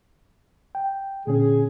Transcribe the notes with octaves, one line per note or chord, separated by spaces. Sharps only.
G5
A#2 D3 C#4 G#4